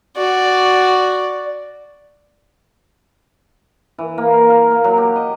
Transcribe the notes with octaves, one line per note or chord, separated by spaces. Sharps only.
F#4 D5
E3
A#3
F5
A#4
A#3
F#3
G4
D#5